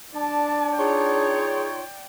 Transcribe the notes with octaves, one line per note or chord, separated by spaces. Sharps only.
D4 D5 A5
D#4 F4 G#4 C#5 D5 G5